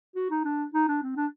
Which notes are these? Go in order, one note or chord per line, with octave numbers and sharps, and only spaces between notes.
F#4
D#4
D4
D#4
D4
C4
D4